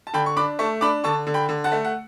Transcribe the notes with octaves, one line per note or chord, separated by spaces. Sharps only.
A5
D3 G5 B5
C#6
D4 B5 D6
A3 A5 C#6
D4 B5 D6
D3 A5 C#6
D3
G5 B5
D3
F#5 A5
A3
F#5